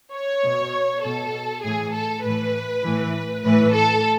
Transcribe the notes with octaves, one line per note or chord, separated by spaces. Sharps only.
C#5
B2
B2 A4
A2 E3 G#4
A4
A2 E3 B4
A2 E3
A2 E3 B4
A4